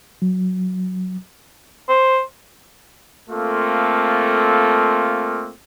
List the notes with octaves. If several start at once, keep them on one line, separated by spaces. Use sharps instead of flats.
F#3
C5
A3 A#3 C4 F4 A4